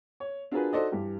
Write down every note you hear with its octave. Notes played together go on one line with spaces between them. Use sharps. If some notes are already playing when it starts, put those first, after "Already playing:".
C#5
D4 F4 F#4 G#4 A#4 B4
D#4 F#4 A4 C5 D5 D#5
G2 E3 G4